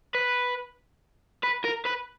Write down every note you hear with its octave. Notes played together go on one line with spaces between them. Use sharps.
B4
B4
A#4
B4